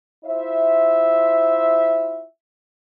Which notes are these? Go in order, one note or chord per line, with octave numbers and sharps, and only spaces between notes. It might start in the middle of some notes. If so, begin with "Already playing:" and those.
E4 F4 C5 E5